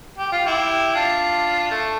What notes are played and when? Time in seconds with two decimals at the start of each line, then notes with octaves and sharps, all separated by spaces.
0.18 G4
0.31 F4
0.46 E4 G4
0.94 D4 F4
1.71 A3